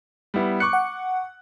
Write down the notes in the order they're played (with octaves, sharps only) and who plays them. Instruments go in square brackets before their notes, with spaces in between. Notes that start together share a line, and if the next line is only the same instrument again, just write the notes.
[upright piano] G3 B3 E4
[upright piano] C#6 D6 F#6 [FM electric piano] C#7
[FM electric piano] F#5